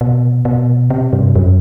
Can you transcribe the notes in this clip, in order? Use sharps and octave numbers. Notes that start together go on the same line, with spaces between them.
B2
B2
C3
G2
F#2